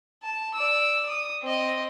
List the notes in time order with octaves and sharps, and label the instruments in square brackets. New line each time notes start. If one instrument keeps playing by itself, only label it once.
[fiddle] A5
D5 E6
D#6
C4 D#5